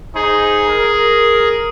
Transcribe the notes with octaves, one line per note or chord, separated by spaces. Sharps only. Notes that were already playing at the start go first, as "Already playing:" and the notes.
D#4 G#4 C5 G#5
A#4